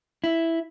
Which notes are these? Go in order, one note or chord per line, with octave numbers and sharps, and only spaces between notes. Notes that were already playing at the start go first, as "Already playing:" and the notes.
E4